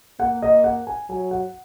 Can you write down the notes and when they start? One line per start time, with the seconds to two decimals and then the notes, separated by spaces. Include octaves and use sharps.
0.19 A#3 F#5
0.42 D#5
0.64 F#5
0.87 G#5
1.09 F#3 G#5
1.31 F#5